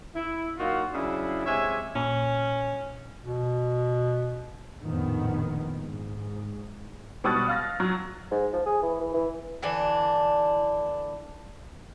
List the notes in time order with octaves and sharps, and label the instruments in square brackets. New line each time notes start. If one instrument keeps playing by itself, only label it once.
[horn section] E4
F#3 A#3 D#4 F4 F#4
C#3 F#3 D4 E4
C3 G#3 C#5 E5 G#5
[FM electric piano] A#2 [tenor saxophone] C#4
[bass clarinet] B2
[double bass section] A#1 F2 A2 D#3 B3
G#2
[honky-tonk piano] B2 G3 C#6 D#6 F#6 A6
F5 F6 A6 A#6
F#3
[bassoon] G#2
F3
G#4
E3
E3
E3
[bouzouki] D3 E3 D4